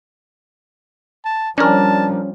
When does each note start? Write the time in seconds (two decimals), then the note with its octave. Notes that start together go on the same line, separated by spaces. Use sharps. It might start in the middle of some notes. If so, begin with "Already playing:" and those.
1.25 A5
1.58 F3 G3 C#4 D4 A#4 A5